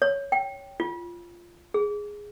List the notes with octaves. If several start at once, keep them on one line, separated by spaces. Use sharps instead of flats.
C#5
G5
F4
G#4